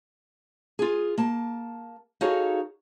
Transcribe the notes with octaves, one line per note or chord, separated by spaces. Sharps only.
F4 G#4
A#3 A5
D#4 F#4 G#4 A4 C#5 F5